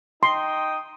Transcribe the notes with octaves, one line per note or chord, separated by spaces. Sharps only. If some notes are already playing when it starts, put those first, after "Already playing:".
D#4 G5 C6 D#6